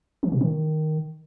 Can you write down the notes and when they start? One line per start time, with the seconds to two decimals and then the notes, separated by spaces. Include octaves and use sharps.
0.23 E3
0.32 B2
0.41 D#3